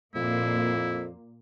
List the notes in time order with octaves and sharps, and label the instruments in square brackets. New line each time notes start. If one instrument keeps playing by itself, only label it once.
[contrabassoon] F2 [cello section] A#2 A#3 [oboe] E4